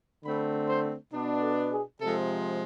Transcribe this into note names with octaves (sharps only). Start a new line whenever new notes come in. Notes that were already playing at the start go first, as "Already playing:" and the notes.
D3 A3 C4 B5
C5
B2 B3 D4
A4
G#4
C3 F3 G#3 A4